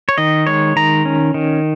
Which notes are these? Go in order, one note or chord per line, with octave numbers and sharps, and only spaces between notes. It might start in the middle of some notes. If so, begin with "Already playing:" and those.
C#5
D#3 D#5
G#3 C#5
D#3 A#5
C#4
D#3